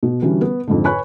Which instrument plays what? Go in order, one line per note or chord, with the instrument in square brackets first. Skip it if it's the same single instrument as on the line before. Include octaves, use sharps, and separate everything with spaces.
[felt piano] B2
D3 E3 G3 C#4 F#4
B3
F2 G#2 D3
B4 C#5 G#5 B5 C#6 F#6